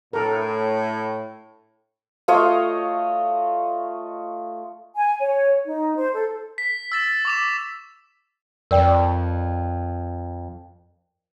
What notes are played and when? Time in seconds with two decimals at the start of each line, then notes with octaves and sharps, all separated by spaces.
0.13 A2 A4 A#4
2.28 A3 F4 C#5 D#5
4.96 G#5
5.20 C#5
5.65 D#4
5.96 C5
6.14 A4
6.58 B6
6.92 E6 A6 E7
7.25 C#6 D6 E7
8.71 F2 A#4 D5 G5